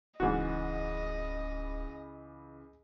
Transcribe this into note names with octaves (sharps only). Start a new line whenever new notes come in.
D1 C#2 G#2 E3 F#4 D#5